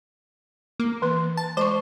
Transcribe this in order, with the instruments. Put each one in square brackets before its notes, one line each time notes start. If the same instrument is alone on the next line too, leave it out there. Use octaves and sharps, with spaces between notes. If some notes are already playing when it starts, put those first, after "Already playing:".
[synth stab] A#3
[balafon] E3 B4
[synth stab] A5
[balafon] G#3 C#6 [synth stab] C5